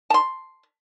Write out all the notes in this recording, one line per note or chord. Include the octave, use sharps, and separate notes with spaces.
A5 C6